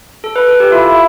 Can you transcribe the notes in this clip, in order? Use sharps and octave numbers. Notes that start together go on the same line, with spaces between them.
A4
B4
A4
G4
E4 F4